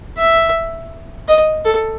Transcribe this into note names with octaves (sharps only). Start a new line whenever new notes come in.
E5
D#5
A4